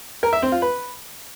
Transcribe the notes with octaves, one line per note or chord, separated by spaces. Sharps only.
A#4
E5
C4
F4
B4